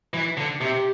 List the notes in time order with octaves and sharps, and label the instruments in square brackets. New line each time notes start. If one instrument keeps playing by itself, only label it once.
[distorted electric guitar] E3
D3
[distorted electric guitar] C3 [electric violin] G4